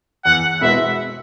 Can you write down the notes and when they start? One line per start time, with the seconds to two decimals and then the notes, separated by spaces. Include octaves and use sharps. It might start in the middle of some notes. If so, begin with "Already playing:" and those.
0.25 E2 F#5
0.61 B2 G#3 B3 E4 E5